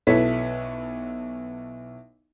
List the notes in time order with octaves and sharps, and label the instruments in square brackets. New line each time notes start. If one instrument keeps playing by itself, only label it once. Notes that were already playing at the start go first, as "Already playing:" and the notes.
[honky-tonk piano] B1 E4 A4 B4 C#5 B6